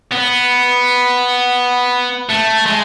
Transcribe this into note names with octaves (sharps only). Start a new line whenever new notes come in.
B3
A3
G#3